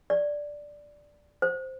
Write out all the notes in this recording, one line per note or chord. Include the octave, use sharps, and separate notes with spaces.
D5
C5